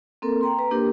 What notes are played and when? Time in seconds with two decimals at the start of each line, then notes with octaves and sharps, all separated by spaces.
0.22 A#3 C4 A4 A#4
0.41 G5 A#5 C6
0.59 B4 A#5
0.71 A#3 D4 G4 A#4